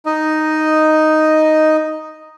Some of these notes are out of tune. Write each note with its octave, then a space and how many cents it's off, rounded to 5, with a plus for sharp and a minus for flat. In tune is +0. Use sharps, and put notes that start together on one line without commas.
D#4 +0 D#5 +0